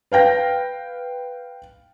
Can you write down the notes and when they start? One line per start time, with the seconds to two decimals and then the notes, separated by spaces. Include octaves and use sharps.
0.12 B4 F5 G5 A#6